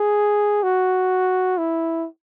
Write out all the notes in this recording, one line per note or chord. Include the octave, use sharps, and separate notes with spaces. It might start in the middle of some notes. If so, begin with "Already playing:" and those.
Already playing: G#4
F#4
E4